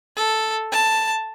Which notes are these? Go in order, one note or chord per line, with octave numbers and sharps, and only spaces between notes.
A4
A5